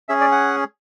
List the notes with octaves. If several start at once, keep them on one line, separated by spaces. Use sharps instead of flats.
C#4 G#4 E5
D5
F#5